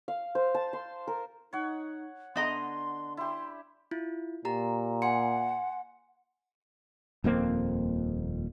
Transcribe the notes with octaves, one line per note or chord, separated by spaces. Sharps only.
F5
C5
A5
C6
A#4
D#4 C#5 F#5
D3 B3 D#5 A#5 C6
E4 G4 C6
E4 F4
A#2 G4 A#5
F#5 G#5 C6 C#7
D#1 F2 A#3 C4